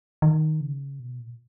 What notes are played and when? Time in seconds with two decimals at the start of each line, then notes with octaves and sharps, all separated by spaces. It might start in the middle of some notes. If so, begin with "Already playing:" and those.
0.22 D#3
0.61 C#3
1.00 B2
1.19 A#2